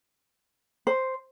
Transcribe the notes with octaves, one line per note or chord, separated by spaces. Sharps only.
C5